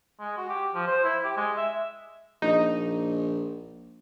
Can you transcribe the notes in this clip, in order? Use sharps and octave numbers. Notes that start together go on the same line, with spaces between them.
G#3
F#4
G4
F3
C5
E4
G4
G#3
E5
A#1 D#4